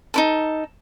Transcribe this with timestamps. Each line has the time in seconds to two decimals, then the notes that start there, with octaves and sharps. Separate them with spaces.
0.14 D#4 E4 A4